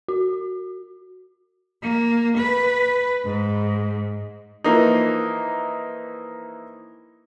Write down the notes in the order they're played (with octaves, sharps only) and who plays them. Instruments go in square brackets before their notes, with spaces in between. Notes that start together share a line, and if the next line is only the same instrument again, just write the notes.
[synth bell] F#4
[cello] A#3
B4
G#2
[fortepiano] E3 F3 A#3 D#4